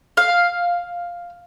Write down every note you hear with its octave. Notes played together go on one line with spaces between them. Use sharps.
F5